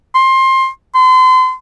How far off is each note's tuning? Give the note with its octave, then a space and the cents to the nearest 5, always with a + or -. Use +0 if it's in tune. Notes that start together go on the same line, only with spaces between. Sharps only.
C6 +20
C6 -35